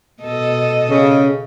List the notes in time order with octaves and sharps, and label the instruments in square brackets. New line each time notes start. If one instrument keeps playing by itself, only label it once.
[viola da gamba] B2 A4 D#5
[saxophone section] C#3